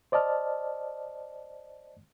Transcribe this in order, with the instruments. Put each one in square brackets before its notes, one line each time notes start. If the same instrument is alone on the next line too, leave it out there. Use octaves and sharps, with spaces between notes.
[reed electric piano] C5 D5 D#5 A5 F6